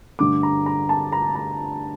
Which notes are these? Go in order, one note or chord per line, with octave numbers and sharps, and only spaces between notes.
G2 D3 A3 D6
A#5
A#5
A5
A#5
A#5